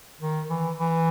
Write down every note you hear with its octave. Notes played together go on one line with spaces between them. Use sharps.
D#3
E3
E3